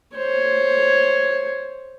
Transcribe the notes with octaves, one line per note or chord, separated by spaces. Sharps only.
C5 C#5